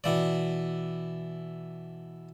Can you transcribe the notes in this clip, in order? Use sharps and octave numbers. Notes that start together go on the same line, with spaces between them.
B2 E3 D5